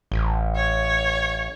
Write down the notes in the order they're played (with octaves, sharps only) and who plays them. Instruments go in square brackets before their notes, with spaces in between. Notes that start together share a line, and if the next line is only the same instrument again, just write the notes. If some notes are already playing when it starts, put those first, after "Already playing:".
[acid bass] A1
[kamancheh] C#5